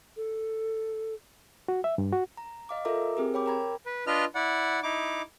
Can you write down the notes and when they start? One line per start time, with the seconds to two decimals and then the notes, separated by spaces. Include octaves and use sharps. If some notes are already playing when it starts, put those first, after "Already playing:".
0.17 A4
1.68 F#4
1.84 E5
1.98 G2
2.12 F#4
2.37 A#5
2.69 D#5 F5 D6
2.85 F4 A4 A#4 E5 A#5 D6
3.17 C4 G4 G#4 A#4
3.34 C#5 G5 B5 D6
3.46 A#4 G5 A#5 B5 G#6
3.86 B4
4.07 D4 F4 B4 D#5 F6
4.35 E4 D5 F#5
4.83 D#4 E4 D6